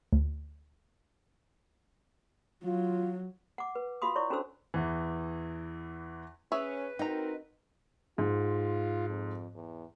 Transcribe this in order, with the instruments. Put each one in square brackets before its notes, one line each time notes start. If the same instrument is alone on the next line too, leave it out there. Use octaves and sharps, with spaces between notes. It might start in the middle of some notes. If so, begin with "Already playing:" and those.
[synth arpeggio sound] D2
[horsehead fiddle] F#3 [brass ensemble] F4
[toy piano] F#5 D6
B4
F4 F#4 F5 C6 D#6
E4 C#5 D5 C#6
C#4 D4 F#4 A4 C5 E6
[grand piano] E2 E3
[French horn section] C#4 [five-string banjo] G#4 C#5 E5 [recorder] B4
[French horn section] C4 F#4 A#4 [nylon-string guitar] D#4 [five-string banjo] G5 A#5
[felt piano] G#2 [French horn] F4
[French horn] F2
E2